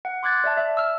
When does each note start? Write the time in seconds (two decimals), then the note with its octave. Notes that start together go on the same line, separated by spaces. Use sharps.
0.05 F#5
0.23 C6 D6 F#6 G#6 A6
0.44 D5 E5 A5
0.57 E5
0.77 E6 F6